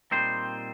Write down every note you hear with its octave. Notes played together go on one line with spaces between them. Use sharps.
A#2 G3 C4 D#4 C5